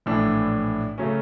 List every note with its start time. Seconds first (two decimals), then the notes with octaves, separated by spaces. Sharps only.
0.06 A#1 A2 E3 A3 D4
0.98 C#3 F#3 A3 C#4